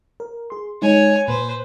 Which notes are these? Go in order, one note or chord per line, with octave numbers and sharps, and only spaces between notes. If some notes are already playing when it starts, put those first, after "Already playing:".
A#4
G#4 C6
G#3 D#4 C#5 G#5
A#2 B4 C5